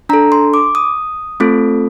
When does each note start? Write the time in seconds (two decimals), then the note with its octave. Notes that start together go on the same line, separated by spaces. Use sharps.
0.09 D4 A4 A#5
0.32 C6
0.54 D6
0.75 D#6
1.40 A3 C4 F4 A4